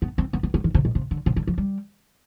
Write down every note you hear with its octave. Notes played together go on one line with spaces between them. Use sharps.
B3
C4
B3
B3
B3
D#3
C3
B2
C3
D3
C3
D3
F3
G3